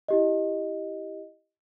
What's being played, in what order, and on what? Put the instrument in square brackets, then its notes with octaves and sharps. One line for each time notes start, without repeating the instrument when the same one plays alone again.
[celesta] E4 G4 D#5